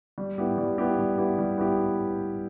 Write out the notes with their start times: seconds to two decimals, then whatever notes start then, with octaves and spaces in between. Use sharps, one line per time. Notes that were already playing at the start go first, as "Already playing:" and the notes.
0.18 G3
0.38 B3 E4 G4
0.58 G3
0.78 B3 E4 G4
0.98 G3
1.18 B3 E4 G4
1.39 G3
1.58 B3 E4 G4